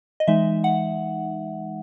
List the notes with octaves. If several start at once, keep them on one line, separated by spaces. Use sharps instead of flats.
D#5
E3 G#3 D#4 E5
F#5